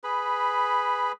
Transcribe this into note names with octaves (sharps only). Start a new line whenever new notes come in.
G#4 B4 B5